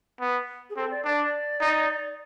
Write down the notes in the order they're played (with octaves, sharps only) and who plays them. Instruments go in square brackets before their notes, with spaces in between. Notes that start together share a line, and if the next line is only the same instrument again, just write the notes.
[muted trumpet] B3
[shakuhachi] G#4
[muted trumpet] C4 [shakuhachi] A4
[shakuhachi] D5
[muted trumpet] D4 [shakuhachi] D5
[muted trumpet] D#4